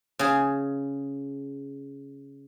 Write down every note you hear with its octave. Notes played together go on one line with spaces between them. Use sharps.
C#3 G#4